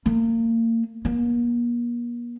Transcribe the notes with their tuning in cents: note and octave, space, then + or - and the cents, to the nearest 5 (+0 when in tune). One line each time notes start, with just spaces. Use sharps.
A#3 -35
A#3 +40